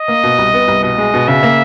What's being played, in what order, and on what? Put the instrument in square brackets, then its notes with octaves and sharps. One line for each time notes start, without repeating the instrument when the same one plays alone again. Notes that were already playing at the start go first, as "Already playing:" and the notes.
Already playing: [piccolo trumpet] D#5
[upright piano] A#3
B2
C2
B3
C2
[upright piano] B2 [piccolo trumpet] D#5
[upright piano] G#3
B2
[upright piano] C#3 [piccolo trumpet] E5
[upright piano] A#3